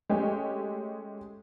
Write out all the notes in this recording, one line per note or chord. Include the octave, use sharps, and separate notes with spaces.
G#3 A3 C#4 G4 G#4